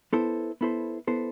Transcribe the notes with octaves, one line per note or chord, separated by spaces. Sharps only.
B3 E4 A4 C5
B3 E4 A4 C5
B3 E4 A4 C5